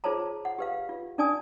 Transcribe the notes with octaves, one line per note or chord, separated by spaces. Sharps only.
F4 G#4 C5 C#5 A5 A#5
F#5
G4 B4 F5
F4
C#4 D4 D5 G#5 A5 D#6